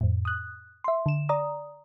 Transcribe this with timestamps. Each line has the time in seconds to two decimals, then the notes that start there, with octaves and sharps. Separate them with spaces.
0.01 F2 A2
0.25 D#6 F#6
0.84 E5 C6
1.06 D3 E7
1.29 D5 A#5 D#6